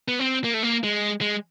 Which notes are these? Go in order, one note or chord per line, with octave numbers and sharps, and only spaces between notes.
B3
C4
A#3
A3
A#3
G#3
G#3